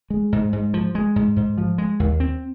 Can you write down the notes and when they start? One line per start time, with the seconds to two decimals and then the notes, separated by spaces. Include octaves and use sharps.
0.10 G#3
0.32 G#2
0.53 G#2
0.74 F3
0.95 G#3
1.16 G#2
1.36 G#2
1.58 F3
1.78 G#3
2.00 D#2
2.20 C4